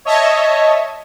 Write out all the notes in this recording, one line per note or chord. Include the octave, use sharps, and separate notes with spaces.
C#5 D#5 E5 A5